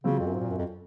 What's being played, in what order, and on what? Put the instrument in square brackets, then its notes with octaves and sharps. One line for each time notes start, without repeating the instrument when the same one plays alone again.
[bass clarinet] C#3 [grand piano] F#3 C4 F4
[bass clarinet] F2
F#2
G#2
A#2
F#2
F2